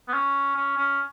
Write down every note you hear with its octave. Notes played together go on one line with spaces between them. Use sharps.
B3
C#4
C#4
C#4